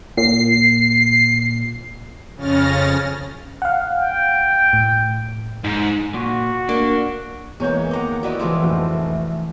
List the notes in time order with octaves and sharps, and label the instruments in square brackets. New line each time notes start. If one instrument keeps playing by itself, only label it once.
[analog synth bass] A#2 [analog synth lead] C7
[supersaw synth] F2 C#3 C#4 F6 A6 A#6
[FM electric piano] F5 F#5
[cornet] G5
[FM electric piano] A2
[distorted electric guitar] G#2
[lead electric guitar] A#2 [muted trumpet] F#4
[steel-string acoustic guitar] A#3 [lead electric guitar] D4
[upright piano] E2 C#5 G6 [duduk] E3 [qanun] G#3 A#3
[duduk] D#3 [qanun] A#3 D#5 [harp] F#5 A#5 D6
[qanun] B3 E4 G4 [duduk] F#4 [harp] D5 D#5 D6
[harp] E3 F4 [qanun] F3 G#3 C4 [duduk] A3
[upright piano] F1 A2 F#4